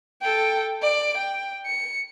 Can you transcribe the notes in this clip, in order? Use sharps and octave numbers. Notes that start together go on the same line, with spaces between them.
A4 G5
D5 D7
G5
C#7